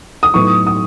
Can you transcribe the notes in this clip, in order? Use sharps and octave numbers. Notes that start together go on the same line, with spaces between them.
D#6
A2 F#3 B3 D#4 C#6
D#6